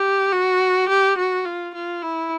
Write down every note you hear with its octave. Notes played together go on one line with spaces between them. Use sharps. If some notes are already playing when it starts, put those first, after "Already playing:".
Already playing: G4
F#4
G4
F#4
F4
F4
E4